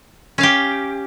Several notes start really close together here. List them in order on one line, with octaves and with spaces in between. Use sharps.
C#4 F5 G4